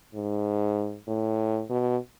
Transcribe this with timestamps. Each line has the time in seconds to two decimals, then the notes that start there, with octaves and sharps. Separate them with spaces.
0.14 G#2
1.07 A2
1.69 B2